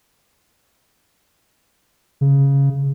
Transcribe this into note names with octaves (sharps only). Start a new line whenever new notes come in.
C#3